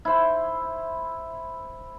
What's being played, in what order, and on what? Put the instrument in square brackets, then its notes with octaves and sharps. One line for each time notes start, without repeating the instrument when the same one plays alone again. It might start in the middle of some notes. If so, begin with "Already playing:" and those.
[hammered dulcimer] E4 C5